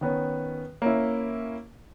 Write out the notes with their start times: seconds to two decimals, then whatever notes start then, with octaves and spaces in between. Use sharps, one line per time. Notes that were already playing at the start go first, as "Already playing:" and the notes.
0.01 D#3 B3 C#4
0.82 A#3 C#4 E4